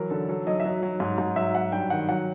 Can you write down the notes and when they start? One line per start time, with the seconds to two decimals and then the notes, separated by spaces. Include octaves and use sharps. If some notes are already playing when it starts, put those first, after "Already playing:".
Already playing: E3 F#3 A#4
0.10 D3 A4
0.29 F#3 A4
0.47 F#3 D#5
0.60 E5
0.65 F#3 D#5
0.83 F#3
1.00 G#2
1.18 G#2
1.36 F#3 E5
1.55 F#3 F#5
1.72 G2 G5
1.90 D#3 F#5
2.09 F#3 F#5